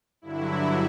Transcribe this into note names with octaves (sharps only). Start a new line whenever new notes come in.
G2 D3 F#3 E4